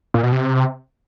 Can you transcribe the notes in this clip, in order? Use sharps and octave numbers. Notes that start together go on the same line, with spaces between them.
A#2
B2
C3